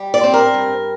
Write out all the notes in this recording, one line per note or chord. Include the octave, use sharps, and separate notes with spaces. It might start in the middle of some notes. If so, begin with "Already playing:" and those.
Already playing: G3
D5
C4
A#4
G2